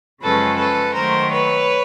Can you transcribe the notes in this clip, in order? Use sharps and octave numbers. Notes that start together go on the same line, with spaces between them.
F#2 C#3 F3 G#3 C#4 A4 B4
A4 B4
D#3 F#3 A3 A#4 C5
B4 C#5